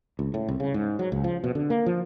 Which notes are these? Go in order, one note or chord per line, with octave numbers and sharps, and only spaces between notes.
C#2
A2
C2
C#3
G#2
F#3
C#2
F3
B2
D3
A#3
F3